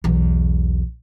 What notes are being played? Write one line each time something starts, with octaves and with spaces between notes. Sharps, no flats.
B1 E2